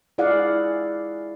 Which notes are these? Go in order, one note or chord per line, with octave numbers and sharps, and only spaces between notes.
E4 G#4 D5 F5 F#5